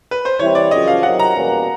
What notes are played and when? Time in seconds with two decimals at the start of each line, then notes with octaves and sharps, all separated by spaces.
0.11 B4
0.25 C5
0.39 E3 G3 C4 E4 C#5
0.55 D5
0.71 F#2 C#3 F3 D#5
0.88 F5
1.03 C3 D#3 F#3 F#5
1.19 A#5
1.35 E2 B2 G3 A#3 C#4